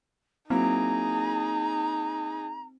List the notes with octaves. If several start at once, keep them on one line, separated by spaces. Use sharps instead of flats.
F#3 A#3 C4 D#4 E4 G#4 A#5